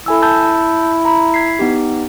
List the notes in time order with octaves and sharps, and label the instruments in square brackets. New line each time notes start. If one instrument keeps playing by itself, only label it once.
[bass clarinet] E4 [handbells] A4 G#5 E6
[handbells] A5 E6 G6
A#5 B5
G#6 B6 C7
B3 D#4 G4